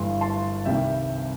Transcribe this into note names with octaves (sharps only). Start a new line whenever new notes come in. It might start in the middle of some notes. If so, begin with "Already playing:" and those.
Already playing: G1 G2 E3 G3 C6
A5 C6
C2 C3 D#3 G3 E5 G5